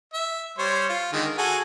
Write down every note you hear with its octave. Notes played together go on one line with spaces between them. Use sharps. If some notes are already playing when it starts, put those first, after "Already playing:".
E5
G3 C5 C#5
F4
D3 D#3 G#3
A#4
F#4 G#4 A4